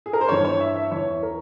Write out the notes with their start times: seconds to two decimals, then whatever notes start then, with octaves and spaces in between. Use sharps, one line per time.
0.06 G#4
0.13 A#4
0.21 C5
0.29 G2 E3 C#5
0.45 C#5
0.60 E5
0.76 E5
0.91 E2 E3 C#5
1.23 A#4